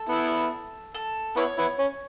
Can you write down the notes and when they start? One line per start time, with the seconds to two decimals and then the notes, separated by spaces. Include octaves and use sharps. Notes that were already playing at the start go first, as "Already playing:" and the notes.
Already playing: A4
0.09 B3 E4
0.94 A4
1.36 B3 E4 C#5
1.58 B3 E4
1.79 C#4